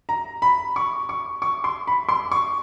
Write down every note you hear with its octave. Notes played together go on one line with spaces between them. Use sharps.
A#5
B5
C#6
C#6
C#6
C6
B5
C6
C#6